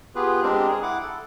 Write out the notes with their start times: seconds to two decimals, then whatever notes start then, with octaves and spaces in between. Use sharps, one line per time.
0.15 B3 F4 G4 G#4 B4
0.43 G#3 C4 D4 G4 A#4
0.67 G#4
0.83 E4 F#5 D6
1.03 A4